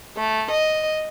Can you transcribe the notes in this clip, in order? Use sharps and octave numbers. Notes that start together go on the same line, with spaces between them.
A3
D#5